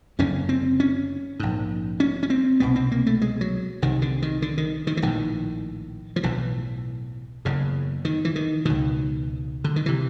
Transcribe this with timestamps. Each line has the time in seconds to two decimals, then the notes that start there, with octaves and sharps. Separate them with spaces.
0.19 F#1 F#2 D3 C#4
0.49 C4
0.80 C#4
1.40 A#1 G#2
2.00 C#4
2.23 C#4
2.30 C4
2.60 C2 B2 B3
2.76 C4
2.92 A#3
3.07 A3
3.22 G#3
3.41 F#3
3.82 C2 C3 D#3
4.02 D3
4.22 D#3
4.42 D3
4.57 D#3
4.87 D#3
4.97 E3
5.02 A#1 A2 D#3
6.16 F3
6.23 B1 A2 E3
7.45 F#1 E2 C#3
8.05 D#3
8.25 E3
8.36 D#3
8.65 C#2 B2 D#3
9.64 D3
9.76 D#3
9.86 C3 E3